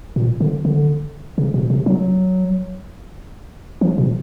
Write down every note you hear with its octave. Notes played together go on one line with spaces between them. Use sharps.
A#2
D3
D3
C#3
B2
C3
F#3
F3
B2